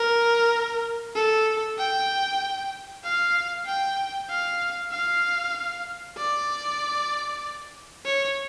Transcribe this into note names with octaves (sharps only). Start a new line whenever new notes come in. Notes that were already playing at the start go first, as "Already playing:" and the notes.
Already playing: A#4
A4
G5
F5
G5
F5
F5
D5
C#5